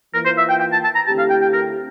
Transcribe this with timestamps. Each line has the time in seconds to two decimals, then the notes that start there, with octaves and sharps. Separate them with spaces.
0.14 E3 A#3 F4 A#4
0.25 C5
0.38 E5
0.49 G5
0.60 G5
0.72 A5
0.84 A5
0.95 A#5
1.06 D3 A3 C4 E4 G4 A5
1.18 F5
1.30 G5
1.42 G5
1.53 A#4